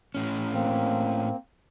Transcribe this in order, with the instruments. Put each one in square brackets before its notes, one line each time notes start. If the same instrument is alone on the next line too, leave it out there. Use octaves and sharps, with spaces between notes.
[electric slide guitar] A2 C#4
[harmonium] A#3 C4